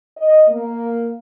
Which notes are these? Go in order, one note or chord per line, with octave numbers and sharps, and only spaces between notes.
D#5
A#3